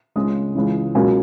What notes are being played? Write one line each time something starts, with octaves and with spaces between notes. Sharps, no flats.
C#2 C#3 G#3 C#4 D#6
C#2 C#3 E3
C#2 B2 F#3 A#3 C#4 G#5